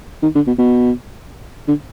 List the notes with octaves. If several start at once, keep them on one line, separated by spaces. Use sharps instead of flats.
D#3
D3
B2
B2
D3